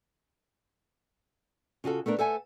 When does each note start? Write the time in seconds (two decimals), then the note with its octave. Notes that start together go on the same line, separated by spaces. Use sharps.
1.84 C#3 F4 F#4 A4
2.06 A3 B3 D4 A#4
2.19 A4 C5 E5 F#5 G#5